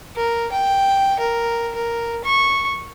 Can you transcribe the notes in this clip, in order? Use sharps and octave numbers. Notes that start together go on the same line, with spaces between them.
A#4
G5
A#4
A#4
C#6